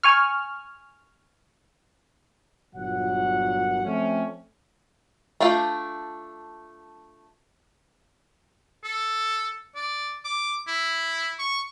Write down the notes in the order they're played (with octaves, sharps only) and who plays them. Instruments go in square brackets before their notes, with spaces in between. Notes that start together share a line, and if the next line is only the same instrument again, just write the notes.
[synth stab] G#5 C#6 F6
[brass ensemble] G1 A#2 F#3 F#5
F3 A3 C4 C#4
[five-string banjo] A3 D4 F4 G5
[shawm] A4
D5
D6
E4
C#6